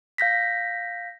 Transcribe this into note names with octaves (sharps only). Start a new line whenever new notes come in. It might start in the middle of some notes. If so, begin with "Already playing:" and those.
F5 G6 A#6 B6